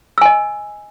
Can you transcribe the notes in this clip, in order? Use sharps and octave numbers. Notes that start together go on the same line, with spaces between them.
D#5 G#5 E6